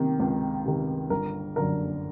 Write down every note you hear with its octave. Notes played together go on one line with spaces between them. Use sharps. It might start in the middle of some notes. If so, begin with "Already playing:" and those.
Already playing: C3 D#3
C#2
C3 D#3
G1 A#4
F#2 D3 A#4